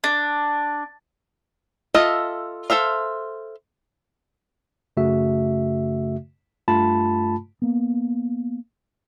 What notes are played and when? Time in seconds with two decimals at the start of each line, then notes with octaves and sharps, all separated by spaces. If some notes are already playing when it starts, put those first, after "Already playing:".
0.04 D4
1.94 F4 A4 D#5 E5
2.70 A4 C5 E5 F5
4.97 F#2 C#3 A3 F#4 E5
6.68 G2 A3 F4 A5 B5
7.62 A#3 B3